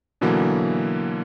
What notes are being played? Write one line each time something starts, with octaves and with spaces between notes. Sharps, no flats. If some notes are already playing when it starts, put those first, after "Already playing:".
B2 D3 E3 F#3 A#3